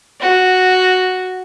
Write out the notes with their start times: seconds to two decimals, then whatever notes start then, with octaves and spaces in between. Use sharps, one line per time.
0.21 F#4